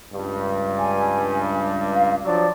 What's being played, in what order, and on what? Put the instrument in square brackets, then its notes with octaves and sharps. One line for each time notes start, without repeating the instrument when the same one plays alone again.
[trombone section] C#2 G2
[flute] G#5
F5
[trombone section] F3 F#3 D4 [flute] D5